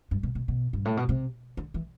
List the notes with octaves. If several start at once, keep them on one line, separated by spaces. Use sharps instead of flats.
G2
B2
B2
B2
G2
A2
B2
C3
D3
E3